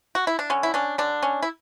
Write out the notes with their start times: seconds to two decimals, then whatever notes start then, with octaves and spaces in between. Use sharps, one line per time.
0.15 F#4
0.27 E4
0.39 D4
0.50 D3 C#4
0.63 E4
0.74 C#4 D4
0.98 D3 D4
1.23 C#4
1.42 E4